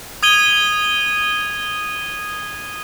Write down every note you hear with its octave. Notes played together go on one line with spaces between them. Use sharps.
D#6 G#6 D#7 G7